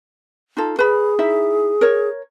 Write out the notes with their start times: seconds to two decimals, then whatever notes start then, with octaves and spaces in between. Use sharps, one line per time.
0.57 D#4 F4 A4
0.79 G#4 B4 B5
1.19 D#4 E4 E5
1.81 A#4 C#5